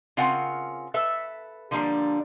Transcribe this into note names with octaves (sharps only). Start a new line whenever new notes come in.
C#3 C4 F4 A#4 F#5 G#5
A4 B4 E5
D3 F3 G3 A#3 D4